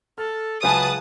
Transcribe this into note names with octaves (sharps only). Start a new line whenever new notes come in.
A4 F6
C#2 F#3 F4 G#4 B4 E5 A5 D#6